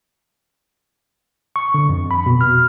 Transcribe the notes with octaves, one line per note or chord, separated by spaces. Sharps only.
C#6
D3
F2
B5
B2
F6